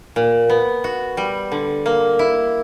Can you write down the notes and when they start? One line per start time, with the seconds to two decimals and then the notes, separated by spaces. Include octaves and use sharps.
0.16 A#2
0.50 B3
0.84 F#4
1.17 G3
1.52 D3
1.86 A#3
2.19 E4